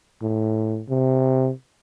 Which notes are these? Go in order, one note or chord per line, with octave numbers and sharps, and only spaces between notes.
A2
C3